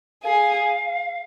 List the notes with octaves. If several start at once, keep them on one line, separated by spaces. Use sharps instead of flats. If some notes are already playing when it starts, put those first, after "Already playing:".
G#4 F5